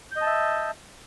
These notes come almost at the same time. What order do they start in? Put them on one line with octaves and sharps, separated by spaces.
G6 D#5 A5 E5